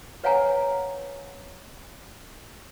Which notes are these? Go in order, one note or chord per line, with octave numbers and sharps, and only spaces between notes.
B4 C#5 F5 F#5 G#5 A#5